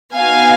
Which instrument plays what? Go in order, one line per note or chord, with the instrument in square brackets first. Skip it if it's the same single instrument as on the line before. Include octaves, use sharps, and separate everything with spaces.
[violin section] B3 D#4 F#4 F5 G#5